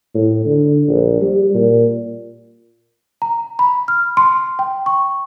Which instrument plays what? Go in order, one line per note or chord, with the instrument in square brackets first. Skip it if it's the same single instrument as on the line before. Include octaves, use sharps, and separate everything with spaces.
[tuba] A2
D3
A#1
G3
A#2
[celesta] A#5
B5
F6
C6
G5
C#6